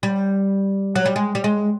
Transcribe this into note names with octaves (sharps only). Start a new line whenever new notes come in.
G3
F#3
G3
G#3
G3
G#3